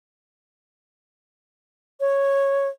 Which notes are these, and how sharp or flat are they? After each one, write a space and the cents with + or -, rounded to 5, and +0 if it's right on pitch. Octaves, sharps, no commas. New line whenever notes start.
C#5 -5